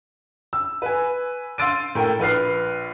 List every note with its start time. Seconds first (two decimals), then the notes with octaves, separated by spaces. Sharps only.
0.53 E6
0.82 B4 G#5
1.58 F5 C6 E6 A6 D7 D#7
1.95 A2 A#4 G5
2.19 A#1 B4 F6 C7